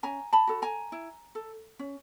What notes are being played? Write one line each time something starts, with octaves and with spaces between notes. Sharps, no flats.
C#4 G#5 A#5
A5 B5
F#4 A4
G#5 A#5
E4
A4
C#4